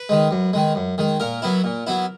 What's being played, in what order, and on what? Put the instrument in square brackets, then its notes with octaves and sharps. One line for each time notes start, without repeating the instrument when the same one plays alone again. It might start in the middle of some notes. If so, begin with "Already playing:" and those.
Already playing: [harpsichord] B4
D#3 G#3
F#2
D#3 G#3
F#2
D#3 G#3
A#2 A#4
F#3 B3 E4
A#2
F#3 B3 E4